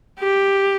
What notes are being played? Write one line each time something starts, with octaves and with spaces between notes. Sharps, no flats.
G4